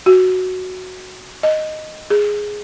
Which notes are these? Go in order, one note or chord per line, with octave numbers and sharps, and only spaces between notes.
F#4
D#5
G#4